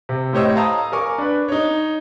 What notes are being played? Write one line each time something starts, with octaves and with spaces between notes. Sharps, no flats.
C3
A2 G4 C5 C#5 D#5 E6
F5 A5 A#5 D#6 E6
A#4 G#5 C#6 D6
D4 B4
D#4 C#5